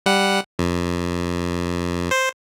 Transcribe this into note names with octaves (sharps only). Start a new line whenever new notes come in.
G3 F#5
F2
C5